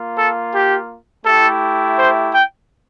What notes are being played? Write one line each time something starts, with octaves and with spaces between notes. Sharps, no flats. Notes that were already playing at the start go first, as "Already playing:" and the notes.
Already playing: A#3 F4
A4
G4
A3 E4 G4 A4
C5
G5